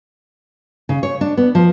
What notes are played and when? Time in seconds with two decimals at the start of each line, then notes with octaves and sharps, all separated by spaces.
0.89 C#3
1.03 C#5
1.21 D4
1.37 B3
1.55 F3